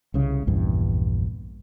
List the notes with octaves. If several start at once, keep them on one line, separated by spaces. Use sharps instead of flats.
C2 C#3
A#1 E2 G2